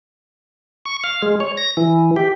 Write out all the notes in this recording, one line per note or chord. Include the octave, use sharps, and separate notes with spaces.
C#6
F5
G#3
C#5
A#6
E3
G4